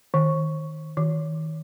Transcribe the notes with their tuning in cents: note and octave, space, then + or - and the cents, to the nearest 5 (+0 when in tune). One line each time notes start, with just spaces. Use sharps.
D#3 +5
D#3 +30